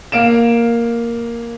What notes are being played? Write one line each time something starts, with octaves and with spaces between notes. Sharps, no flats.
A#3 F5 D7 E7